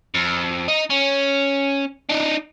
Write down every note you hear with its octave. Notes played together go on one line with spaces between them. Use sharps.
F2
D#4
C#4
D4 D#4